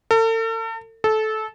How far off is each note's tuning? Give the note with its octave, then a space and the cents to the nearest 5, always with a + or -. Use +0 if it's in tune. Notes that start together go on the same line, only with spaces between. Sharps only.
A4 +40
A4 -20